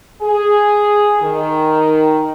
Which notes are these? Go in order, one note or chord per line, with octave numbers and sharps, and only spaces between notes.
G#4
D#3